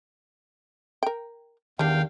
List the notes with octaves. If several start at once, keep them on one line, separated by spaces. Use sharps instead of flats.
A#4 G5
E2 D#3 G3 D4 F5 G5